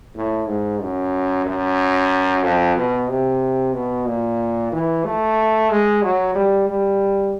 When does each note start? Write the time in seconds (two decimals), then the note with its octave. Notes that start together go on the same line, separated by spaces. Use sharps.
0.15 A2
0.47 G#2
0.81 F#2
1.46 F#2
2.43 F2
2.76 B2
3.09 C3
3.73 B2
4.07 A#2
4.72 E3
5.05 A3
5.70 G#3
6.03 F#3
6.35 G3
6.68 G3